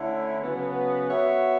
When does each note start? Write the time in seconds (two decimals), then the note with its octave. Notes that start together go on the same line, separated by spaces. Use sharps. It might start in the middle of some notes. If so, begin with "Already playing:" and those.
Already playing: D3 A3 C#4 E4
0.40 C#3 F#3 B3
1.09 B3 F#4 C#5 E5